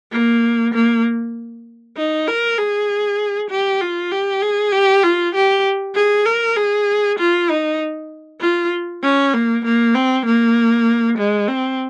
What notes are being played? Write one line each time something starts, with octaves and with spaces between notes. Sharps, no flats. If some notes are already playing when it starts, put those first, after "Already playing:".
A#3
A#3
D#4
A#4
G#4
G4
F4
G4
G#4
G4
F4
G4
G#4
A#4
G#4
F4
D#4
F4
C#4
A#3
A#3
C4
A#3
G#3
C4